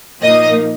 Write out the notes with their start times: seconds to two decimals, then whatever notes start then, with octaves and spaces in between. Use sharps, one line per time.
0.21 A#2 F3 A#3 D#4 D#5